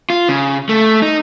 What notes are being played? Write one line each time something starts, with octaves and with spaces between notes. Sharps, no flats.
F4
C#3
A3
D#4